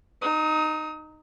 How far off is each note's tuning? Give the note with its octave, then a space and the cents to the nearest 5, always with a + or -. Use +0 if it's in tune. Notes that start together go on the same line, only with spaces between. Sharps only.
D#4 -10 D#6 +35